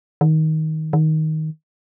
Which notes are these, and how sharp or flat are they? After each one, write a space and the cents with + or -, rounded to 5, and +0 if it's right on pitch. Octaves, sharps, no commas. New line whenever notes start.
D#3 +15
D#3 +10